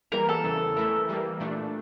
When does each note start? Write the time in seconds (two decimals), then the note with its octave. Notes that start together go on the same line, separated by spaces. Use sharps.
0.12 E3 G3 A#3 A#4
0.29 A4
0.44 E2 C#3 E3
0.77 E3 A3 E4 A#4 E5
1.09 E3 G3 A#3
1.40 A#2 A3 D4